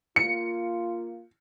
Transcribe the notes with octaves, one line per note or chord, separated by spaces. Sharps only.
A#3 F4 C#7